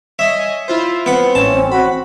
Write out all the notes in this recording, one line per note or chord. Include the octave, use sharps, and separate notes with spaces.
C#5 D#5 E5 G#5
E4 F4 C5
B3 C4 F#5
A1 C#4 A5
F#4 B5